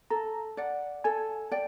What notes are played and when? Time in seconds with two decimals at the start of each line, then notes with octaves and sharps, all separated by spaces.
0.10 A4 A#5
0.57 D5 F#5
1.04 A4 G#5
1.51 D5 G5